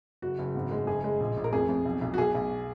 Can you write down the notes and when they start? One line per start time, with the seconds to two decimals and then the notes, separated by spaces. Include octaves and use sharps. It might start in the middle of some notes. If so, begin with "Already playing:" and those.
0.22 F#1 F#4
0.39 F#1
0.55 G#1
0.71 G#3
0.87 F#1 G#4
1.04 G#3
1.20 A#1
1.37 A#1
1.44 A#4
1.53 F2 G#4
1.69 F2
1.85 B1
2.01 B1
2.14 F#4
2.18 B1 G#4
2.35 B1